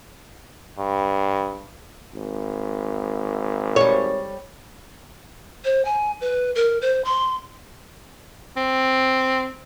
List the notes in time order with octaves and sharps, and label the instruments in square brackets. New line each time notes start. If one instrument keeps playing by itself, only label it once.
[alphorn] G2
[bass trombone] G#1
[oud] G3 C#5
[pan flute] C5
G#5
B4
A#4
C5
C6
[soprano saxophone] C4